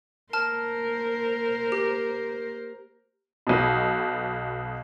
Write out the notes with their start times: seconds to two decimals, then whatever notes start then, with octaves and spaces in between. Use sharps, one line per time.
0.33 A#3 A#4 C5 A5 F6
1.72 G4
3.47 B1 B2